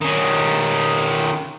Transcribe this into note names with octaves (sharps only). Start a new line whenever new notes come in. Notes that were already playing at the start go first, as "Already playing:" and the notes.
D#3 C#4